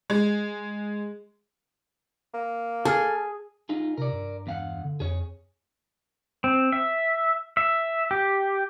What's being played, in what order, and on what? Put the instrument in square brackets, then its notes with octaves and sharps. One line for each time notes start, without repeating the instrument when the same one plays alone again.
[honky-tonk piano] G#3
[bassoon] A#3
[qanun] G#4 [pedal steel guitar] A4 F6
[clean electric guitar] D#4 F4 G#4
[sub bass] C3 [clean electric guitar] A#4 D5
[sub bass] G2
[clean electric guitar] E2 F5 F#5
[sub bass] D3
[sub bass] F2 [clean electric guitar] G#4 C#5
[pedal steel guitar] C4
E5
E5
G4